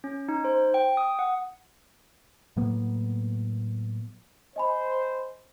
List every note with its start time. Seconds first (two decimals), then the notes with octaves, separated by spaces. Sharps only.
0.04 C#4
0.29 D#4
0.45 C5
0.74 G5
0.97 D#6
1.19 F#5
2.57 A2 F#3 A#3 B3
4.56 C5 D#5 G#5 B5